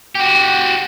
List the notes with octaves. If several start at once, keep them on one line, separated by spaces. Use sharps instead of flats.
F#4 G4